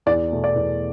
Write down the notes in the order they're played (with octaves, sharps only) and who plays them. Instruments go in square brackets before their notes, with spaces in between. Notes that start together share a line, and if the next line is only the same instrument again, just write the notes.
[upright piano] E2 D5
B2 A3
D5
E2